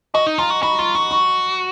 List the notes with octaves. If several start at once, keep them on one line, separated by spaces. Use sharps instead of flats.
F#4 D#5
D#4
F4 A#5
F#4
F#4 B5
F4 C#6
F#4 C#6
C#6